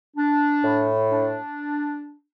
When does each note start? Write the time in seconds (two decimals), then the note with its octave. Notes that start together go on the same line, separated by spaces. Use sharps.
0.17 D4
0.63 A2
1.10 D4